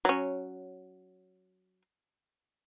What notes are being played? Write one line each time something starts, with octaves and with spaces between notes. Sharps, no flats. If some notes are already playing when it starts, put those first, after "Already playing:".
F#3 C#4